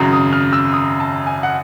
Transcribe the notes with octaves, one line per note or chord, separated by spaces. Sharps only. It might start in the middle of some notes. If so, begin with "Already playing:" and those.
Already playing: G#1 F#2 C#3 F#3
D#6
F6
E6
D#6
A5
G#5
F#5